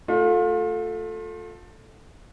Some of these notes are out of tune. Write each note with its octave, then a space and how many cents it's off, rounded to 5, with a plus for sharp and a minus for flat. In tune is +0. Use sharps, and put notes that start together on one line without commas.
A3 +0 F4 +35